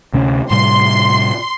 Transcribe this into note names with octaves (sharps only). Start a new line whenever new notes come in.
D2 C3 C#4
A2 C3 G3 C6